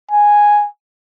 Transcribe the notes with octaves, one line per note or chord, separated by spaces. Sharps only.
G#5